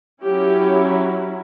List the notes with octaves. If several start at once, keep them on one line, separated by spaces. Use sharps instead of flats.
F#3 C#4 E4 G4